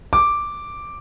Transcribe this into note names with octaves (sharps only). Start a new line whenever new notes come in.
D6